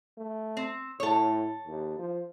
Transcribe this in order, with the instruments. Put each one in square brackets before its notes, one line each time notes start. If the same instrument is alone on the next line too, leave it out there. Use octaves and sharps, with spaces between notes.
[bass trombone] A3
[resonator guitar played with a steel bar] C4
[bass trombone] A2 [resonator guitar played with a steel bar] A4 C#5
[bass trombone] D#2
F3